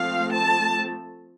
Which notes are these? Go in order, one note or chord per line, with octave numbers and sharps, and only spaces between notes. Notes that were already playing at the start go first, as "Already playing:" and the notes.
Already playing: F3 A3 C4 F5
A5